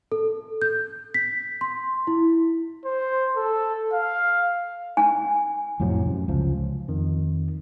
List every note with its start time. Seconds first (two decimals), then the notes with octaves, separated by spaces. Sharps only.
0.12 A4
0.62 G6
1.14 B6
1.61 C6
2.07 E4
2.85 C5
3.36 A4
3.93 F5
4.97 G#5
5.80 F2 A2 C3 F#3
6.06 F#2
6.28 C#2 F3
6.88 F2 D#3